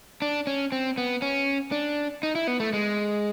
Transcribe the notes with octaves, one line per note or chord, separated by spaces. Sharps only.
D4
C#4
C4
B3
C#4
D4
D#4
E4
B3
A3
G#3